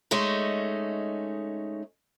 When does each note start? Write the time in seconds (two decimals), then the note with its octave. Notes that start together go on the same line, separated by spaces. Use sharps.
0.11 G#3 A3 C#4 D#4